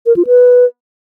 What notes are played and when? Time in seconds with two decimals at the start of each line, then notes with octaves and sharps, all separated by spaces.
0.06 A#4
0.16 F4
0.27 B4